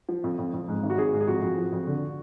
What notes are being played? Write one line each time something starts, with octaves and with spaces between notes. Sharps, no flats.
F3
F2
F2
F2
G#2
G#1
F#4
G#1 G#4
G#2
G#4
F2 F#4
F2
F3
F2
D3